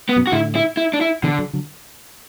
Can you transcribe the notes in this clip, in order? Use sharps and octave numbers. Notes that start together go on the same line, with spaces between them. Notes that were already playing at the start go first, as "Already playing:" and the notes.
B3
F#2 B2
F#4
A2 D3 E4
E4
E4
D4
E4
B2 D3 E3
D3 F#3
D3 F#3